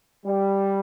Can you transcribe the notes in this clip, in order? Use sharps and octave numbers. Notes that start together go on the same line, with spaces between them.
G3